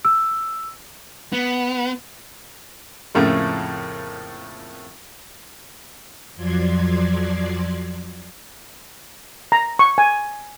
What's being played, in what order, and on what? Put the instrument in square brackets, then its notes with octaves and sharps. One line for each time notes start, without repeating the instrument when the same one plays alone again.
[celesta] E6
[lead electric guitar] B3
[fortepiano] F2 A2 C#3 A3 A#3
[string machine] F2 F3 F#3 D5 C6 G#6
[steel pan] A#5
C#6
G#5